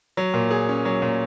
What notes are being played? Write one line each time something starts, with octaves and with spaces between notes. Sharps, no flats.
F#3
A#2
G#4
C#4
F#3
A#2